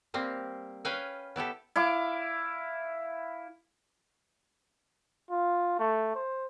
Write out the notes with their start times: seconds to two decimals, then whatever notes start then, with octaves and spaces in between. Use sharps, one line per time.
0.14 G3 A#3 C4
0.85 C#4 B4 F5 G5 G#5
1.36 B3 E4 G4 A4
1.76 E4 F5 D6
5.31 F4
5.79 A3
6.15 C5